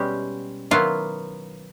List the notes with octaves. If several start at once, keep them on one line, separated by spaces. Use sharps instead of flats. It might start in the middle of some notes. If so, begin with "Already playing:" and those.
Already playing: B2 G3 G#3 C#4 G4
D#3 F#3 B3 E4 F4